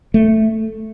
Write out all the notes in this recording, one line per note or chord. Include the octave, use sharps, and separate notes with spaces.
A3